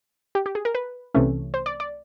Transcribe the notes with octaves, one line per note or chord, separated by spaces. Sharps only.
G4
G4
G#4
A#4
B4
C2 C3 E3 A3 C#4
C5
D5
D5